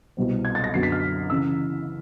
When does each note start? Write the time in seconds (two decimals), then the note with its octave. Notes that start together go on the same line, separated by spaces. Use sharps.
0.17 C2 B2 G3 C4
0.45 G#6
0.55 A6
0.64 A#6
0.74 F#2 D3 F#3 B3 C7
0.83 B6
0.92 F6
1.30 C#3 E3 E6